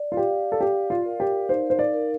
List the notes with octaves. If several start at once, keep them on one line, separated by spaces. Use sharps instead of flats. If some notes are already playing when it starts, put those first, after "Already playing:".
Already playing: D5
F4
G4 F5
A4
G4 D5
F4
A#4
G4
D#4 C5
C5
D5
A#4